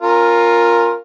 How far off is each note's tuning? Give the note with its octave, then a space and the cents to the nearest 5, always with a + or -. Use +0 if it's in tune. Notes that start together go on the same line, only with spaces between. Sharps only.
C#4 -20 F4 +10 A#4 +0